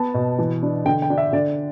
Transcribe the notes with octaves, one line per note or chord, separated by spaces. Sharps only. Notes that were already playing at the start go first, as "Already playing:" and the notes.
Already playing: B3 A5
B2
E3
D4
D3 G5
G5
D4
E5
D3 D5